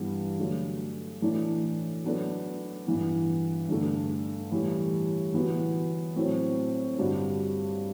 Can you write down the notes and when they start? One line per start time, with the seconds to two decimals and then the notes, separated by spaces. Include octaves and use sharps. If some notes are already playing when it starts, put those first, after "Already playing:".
Already playing: G2 E3 G3 B3
0.39 D3 F#3 A3
1.21 A2 E3 A3 D4
2.04 F#3 B3 D4 A4
2.86 G2 E3 B3
3.68 G2 D3 A3
4.51 A2 E3 G3
5.34 E3 B3 F#4
6.16 A2 F#3 C4
6.98 G2 D3 G3 D4 F#4